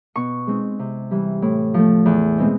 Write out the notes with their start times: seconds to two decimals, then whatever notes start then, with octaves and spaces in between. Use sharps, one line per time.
0.16 B2 C#6
0.47 G#3 C4 D#4
0.79 C3
1.11 E3 G3
1.42 A2
1.74 F3 A3
2.06 E2
2.38 B2 G#3 C4 D#4